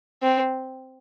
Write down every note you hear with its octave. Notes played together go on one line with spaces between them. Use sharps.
C4